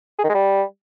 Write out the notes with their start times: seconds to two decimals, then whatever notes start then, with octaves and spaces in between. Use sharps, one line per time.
0.19 G#4
0.24 D#3
0.29 G#3
0.34 G3